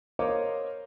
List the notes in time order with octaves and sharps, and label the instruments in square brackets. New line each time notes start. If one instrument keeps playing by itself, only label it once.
[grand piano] A#4 C5 C#5 D#5 F5 D6